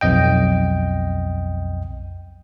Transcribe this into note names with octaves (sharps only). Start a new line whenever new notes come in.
B1 F2 D#5 G5